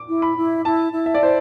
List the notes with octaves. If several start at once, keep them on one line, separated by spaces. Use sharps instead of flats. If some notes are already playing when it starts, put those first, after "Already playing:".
Already playing: D6
E4
B5
E4
E4 A5
E4
E5
D5
E4 C5